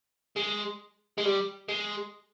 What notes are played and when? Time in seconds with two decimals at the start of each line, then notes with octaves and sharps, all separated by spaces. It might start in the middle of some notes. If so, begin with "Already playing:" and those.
0.37 G#3
1.18 G#3
1.25 G3
1.69 G#3